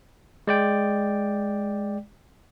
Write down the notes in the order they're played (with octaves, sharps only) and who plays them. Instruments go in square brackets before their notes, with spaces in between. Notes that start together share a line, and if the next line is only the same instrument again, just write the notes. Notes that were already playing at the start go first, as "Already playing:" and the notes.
[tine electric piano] G#3 D5 G5